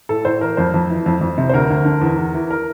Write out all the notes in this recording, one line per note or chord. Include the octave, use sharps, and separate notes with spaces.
A2 A4
A2 C5
E3 A#4
F2 C5
F2
E3
F2
F2
C3
C5
D2 A#4
D2
D3
E2
E2
E3
A#4